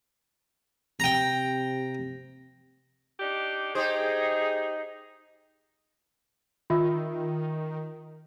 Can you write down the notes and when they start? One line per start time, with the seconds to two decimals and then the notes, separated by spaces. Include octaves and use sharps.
1.00 C3 G5 A#5 A#6
3.20 D4 D#4 G4
3.75 D#4 G4 G#4 C5
6.70 D#3 F4 E5 E6